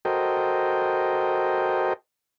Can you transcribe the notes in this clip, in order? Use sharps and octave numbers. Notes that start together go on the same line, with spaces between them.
F#4 A4 A#4 C5 D#5 G5